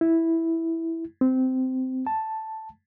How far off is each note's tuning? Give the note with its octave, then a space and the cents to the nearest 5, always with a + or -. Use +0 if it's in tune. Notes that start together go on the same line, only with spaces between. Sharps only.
E4 -5
C4 -15
A5 +0